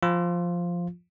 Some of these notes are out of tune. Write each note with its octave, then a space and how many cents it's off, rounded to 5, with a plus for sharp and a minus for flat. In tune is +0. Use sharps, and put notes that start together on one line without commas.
F3 +0 F4 +0